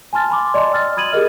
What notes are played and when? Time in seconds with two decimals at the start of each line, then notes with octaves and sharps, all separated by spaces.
0.13 G#5 A5 C6 F6 A6
0.29 G#5 B5 C6 D6
0.54 D5 D#5 A5 C6
0.72 G5 E6 F6 A6
0.97 B5 D#6 G#6 D#7 F#7
1.12 G4 G#4 A#4 D#5 F6